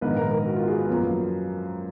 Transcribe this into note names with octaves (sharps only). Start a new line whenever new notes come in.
A#1 G#2 D#3 A#3 B4
A#4
A#4
F#4
F4
G#4
B4
F#2 F3 A#3